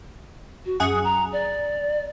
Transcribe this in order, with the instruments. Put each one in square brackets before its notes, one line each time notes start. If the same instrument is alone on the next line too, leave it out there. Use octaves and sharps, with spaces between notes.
[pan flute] F#4
[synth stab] F#2 G#4 F#5 [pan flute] D#6
[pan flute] A#5
D5